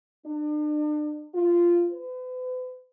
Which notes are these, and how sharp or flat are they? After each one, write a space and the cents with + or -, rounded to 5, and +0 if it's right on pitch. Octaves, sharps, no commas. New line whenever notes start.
D4 +40
F4 -10
B4 +40